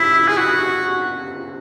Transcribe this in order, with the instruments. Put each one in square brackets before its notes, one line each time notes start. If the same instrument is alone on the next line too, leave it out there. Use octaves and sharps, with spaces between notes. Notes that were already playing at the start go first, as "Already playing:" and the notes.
Already playing: [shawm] E4 [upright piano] B6
[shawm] G#4
F#4